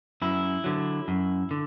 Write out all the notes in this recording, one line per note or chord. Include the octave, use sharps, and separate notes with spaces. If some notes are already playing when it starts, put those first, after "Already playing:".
F#2 E4
D3 F#3
F#2
D3